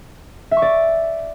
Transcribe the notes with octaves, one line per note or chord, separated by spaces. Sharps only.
E5
C#6
D5